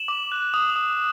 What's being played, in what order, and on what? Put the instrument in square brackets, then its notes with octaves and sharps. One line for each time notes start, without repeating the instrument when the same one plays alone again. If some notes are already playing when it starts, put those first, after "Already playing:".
Already playing: [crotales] E7 F#7
D6
F#6
D#6
D#6